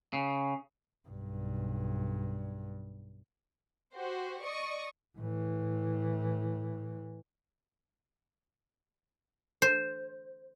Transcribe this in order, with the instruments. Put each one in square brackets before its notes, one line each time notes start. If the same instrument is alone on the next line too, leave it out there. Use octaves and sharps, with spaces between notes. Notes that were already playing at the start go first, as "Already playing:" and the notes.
[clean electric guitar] C#3
[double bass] B1 G2
[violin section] F#4 G4 C5
D5 D#5 C#6 D#6
[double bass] A2 E3
[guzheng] C5